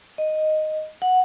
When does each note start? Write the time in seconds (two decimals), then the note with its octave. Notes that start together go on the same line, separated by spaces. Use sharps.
0.18 D#5
1.02 F#5